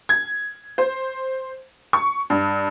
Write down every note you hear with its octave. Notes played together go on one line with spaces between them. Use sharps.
G#6
C5
C#6
G2